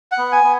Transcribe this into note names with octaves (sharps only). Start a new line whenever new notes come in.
F#5
B3
G#5
B3